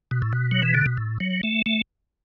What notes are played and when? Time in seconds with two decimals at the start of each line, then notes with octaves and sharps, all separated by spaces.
0.11 B2
0.22 A2
0.33 B2
0.51 F#3
0.62 E3
0.75 D3
0.86 B2
0.97 A2
1.20 F#3
1.43 A3
1.66 A3